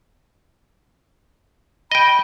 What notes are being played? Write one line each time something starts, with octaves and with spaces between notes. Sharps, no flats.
D#5 G5 B5